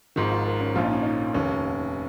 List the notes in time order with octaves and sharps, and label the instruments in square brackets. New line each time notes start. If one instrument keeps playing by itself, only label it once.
[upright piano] G#1 G#2 D#3 [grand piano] F3
[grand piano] F4
A#4
C#4
[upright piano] A#1 A#2 F3 [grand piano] F4
[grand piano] D#4
C#4
D#4
[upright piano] F1 D#2 D#3 [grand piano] C#4